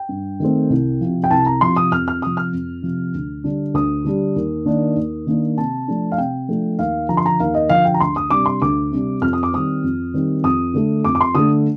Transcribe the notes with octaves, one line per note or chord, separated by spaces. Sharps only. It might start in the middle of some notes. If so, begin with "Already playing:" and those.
Already playing: G5
G2
D#3 A3 C4
C2
C3 F3
G5
C2 A5
A#5
C3 F3 C6
D#6
F2 F6
F6
C3 F3 D#6
F6
F2
C3 F3
D2
D3 G3 D4
D2 D#6
D3 G3 D4
D#2
D#3 A#3 D4
D#2
D#3 A#3 D4
C3 A5
F3 A3 D4
F5
C3 G5
F3 A3 D4
D#2 F5
D3 F3 A#5
C6
A#5
D#2 F5
D#5
D3 F3 F5
G5
A#5
D2 C6
D#6
C3 G3 D4 D6
C6
D2 D6
C3 G3 D4
F2 F6
D#6
D6
D#3 G3 C4 D#6
F2
D#3 G3 C4
F2 D#6
D3 A3
F2 D6
D6
C6
D3 A3 D#6